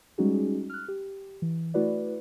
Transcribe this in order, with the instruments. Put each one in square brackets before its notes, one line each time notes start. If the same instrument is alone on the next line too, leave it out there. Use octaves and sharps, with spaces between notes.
[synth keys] G3 G#3 C#4 D#4 F#4 G#4
F6 F#6
G4
E3
A3 E4 F#4 B4 D5